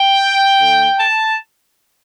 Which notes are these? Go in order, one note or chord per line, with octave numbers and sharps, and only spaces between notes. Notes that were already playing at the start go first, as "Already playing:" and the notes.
Already playing: G5
D3 A3
A5